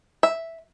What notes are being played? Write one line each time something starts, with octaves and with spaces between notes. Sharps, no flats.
E5